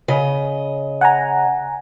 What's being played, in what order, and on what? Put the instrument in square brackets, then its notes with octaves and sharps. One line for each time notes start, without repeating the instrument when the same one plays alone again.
[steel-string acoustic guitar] C#3 D#5
[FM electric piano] F#5 G#5 A#5